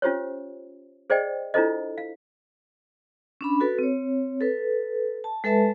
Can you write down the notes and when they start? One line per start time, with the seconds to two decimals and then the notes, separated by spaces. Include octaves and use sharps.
0.02 C#4 F4 G4 C5 C#5
1.10 G#4 C5 D5 D#5 G5
1.54 D4 E4 F4 A4 C5 D#5
1.98 F5
3.41 C#4 D4 B5
3.60 F#4 A4 B4
3.79 C4 C#5
4.41 A4 B4
5.24 A5
5.44 G#3 A4 B4 E5 A5